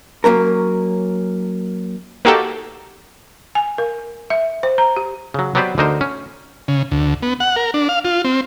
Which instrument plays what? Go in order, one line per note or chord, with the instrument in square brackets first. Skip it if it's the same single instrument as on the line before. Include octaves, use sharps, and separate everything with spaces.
[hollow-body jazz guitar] F#3 A#3 C#4 A#4
[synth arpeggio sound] A#3 D#4 F#4 G4 A4
[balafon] G#5
A#4
E5
C5
A#5
G4
[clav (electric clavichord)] C#3 F#3
F#3 B3 G4 B4 C5 D5
D2 D3 D#4 A#4 C5
C#4
[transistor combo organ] C#3
D2
B3
F#5
A#4
D4
F5
F4
C4